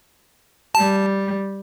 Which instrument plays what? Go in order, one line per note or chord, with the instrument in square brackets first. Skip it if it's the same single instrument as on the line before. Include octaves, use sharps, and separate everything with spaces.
[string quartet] G3 [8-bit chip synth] A5